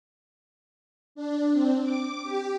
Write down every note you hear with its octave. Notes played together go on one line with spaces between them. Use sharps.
D4
C4
D6
G4